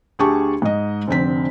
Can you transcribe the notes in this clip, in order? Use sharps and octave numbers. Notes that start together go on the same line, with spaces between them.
D2 G4 G#4 A5 C#6
G#2 D#5
F1 D3 C4 B6